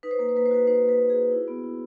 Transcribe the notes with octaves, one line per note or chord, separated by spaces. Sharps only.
D#4 B4
C5
A#3 B4
C5
A#3 B4
C5
F#4 B4
D#4 C5
A#3
B4
A#3
G#4
F#4
E4
B3
E4